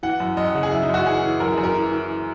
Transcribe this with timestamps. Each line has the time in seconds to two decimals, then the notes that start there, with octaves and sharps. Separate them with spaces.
0.03 E3 F#5
0.20 F#2
0.37 F#2 D#5
0.46 F#5
0.55 C#3
0.63 G#4
0.72 F#2 E4
0.83 D#4
0.89 F#2 F#4
1.06 E3 G#4
1.23 E3
1.40 F#2 A#4
1.52 G#4
1.57 F#2
1.64 A#4
1.74 E3
1.92 E3